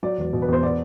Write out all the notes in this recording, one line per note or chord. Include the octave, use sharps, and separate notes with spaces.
F#3 D5
E1
B2
B4
E2 C5
B3 D5